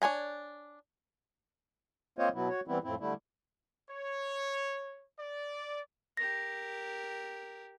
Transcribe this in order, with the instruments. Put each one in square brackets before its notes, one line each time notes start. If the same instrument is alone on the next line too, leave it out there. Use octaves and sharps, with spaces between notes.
[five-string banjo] D4 C#5 G#5 A#5
[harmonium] A#3 C4 F4 C5 C#5 D#5
B2 F#3 B3 E4
F#4 C#5
E3 G3 B3 C4 E4
F2 A2 C4 E4
D3 G3 A3 E4
[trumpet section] C#5
D5
[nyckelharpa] G4 A#4 [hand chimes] A#6